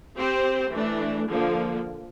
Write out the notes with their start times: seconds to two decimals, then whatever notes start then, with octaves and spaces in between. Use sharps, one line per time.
0.17 C4 G4 C5
0.73 E3 A3 D4
1.29 D3 F3 A#3